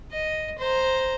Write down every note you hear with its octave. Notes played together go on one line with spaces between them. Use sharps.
D#5
C5 A#5